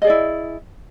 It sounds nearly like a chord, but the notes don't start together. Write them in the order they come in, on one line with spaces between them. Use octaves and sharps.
D#5 G#4 D5 E4